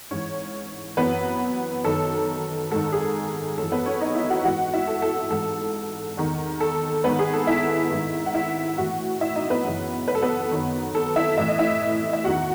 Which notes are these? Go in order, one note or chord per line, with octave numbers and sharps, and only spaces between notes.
G#2 E3 C#4 C#5
F#2 E3 B3 B4
F#2 D#3 A4
G#2 D#3 A4
G#4
F#2 E3 A4
B3 B4
C#4 C#5
D#4 D#5
E4 E5
F#4 F#5
G#2 E3 F#4 F#5
E4 E5
A4
A4
A4
G#2 E3 A4
E2 D#3
A4
G#2 D#3 B3 B4
G#4
A4
E4 E5
G#2 D#3
F#5
E4 E5
A2 E3 F#4 F#5
E4 E5
D#4 D#5
B3 B4
F#2 C#3 E3
B4
A4
B3 B4
F#2 D#3
A4
E4 E5
A2 E3 E5
D#5
E4 E5
E5
E2 D#3 F#4 F#5